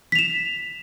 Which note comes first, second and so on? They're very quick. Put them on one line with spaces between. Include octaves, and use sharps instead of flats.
B6 F7 E7